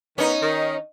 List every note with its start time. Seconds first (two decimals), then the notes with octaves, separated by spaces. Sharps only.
0.18 D#3 B3 C#4 D#4
0.41 D#3